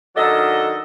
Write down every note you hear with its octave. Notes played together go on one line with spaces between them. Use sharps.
D#3 F#3 D4 A4 D#5